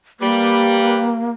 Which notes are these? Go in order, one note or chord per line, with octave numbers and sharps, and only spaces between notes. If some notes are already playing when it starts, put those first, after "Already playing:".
G3 A#3 B4